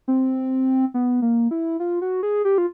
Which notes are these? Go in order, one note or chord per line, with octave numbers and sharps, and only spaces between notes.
C4
B3
A#3
E4
F4
F#4
G#4
G4
F4